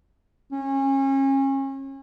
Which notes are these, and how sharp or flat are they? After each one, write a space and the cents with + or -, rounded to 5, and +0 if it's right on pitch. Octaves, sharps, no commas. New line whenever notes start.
C#4 -30